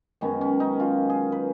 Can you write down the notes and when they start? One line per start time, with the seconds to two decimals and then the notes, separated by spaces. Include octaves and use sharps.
0.21 F#2 D#3 G#3 B3 C#4
0.41 C#4
0.60 D#4
0.80 F4
1.10 G#4
1.32 B4